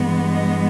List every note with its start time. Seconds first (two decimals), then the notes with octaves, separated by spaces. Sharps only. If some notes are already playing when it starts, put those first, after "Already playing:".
Already playing: G2 E3 G#3 B3
0.33 D#5